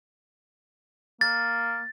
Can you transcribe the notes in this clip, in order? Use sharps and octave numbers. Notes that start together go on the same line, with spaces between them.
A#3 A6